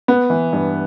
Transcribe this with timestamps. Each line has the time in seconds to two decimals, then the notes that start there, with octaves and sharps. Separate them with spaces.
0.08 B3
0.30 E3
0.53 G2